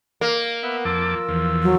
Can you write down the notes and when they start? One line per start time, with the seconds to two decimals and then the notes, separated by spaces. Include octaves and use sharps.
0.21 A#3
0.63 B3 E5 F#5
0.85 F2 F4 A5 D6 E6
1.29 E2 F3
1.63 F#3